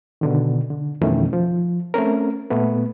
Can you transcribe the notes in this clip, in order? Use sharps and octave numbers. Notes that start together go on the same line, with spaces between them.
B2 D3 D#3
D3
F2 B2 D#3 E3 A3 C#4
F3
A3 C4 C#4 A#4
A#2 A3 B3